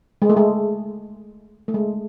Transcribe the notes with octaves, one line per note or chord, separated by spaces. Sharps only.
G#3
A3
G#3
A3
G#3